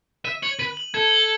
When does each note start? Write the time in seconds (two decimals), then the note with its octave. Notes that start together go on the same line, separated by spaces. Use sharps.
0.25 E5 D#7
0.42 C#5 F#7
0.59 B4 D#7
0.77 F#7
0.94 A4 G#6
1.11 F#7